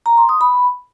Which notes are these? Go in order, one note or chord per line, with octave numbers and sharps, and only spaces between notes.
A#5
C6
D#6
B5